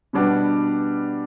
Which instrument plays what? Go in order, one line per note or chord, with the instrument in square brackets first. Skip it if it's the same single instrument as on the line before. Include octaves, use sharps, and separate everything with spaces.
[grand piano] B2 G3 B3 D4 F#4